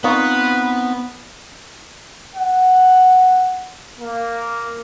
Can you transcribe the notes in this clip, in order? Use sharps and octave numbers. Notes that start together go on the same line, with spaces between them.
B3 C4 D#4 F4 B4 C#6
F#5
A#3